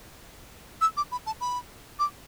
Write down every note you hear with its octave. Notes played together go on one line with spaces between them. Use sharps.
E6
D6
B5
A5
B5
D6